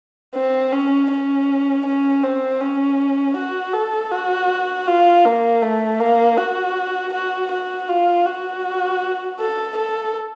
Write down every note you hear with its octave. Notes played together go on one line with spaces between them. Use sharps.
C4
C#4
C#4
C#4
C4
C#4
F#4
A4
F#4
F4
A#3
A3
A#3
F#4
F#4
F#4
F4
F#4
A4
A4